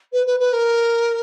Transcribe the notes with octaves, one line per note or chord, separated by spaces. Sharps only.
B4
B4
B4
A#4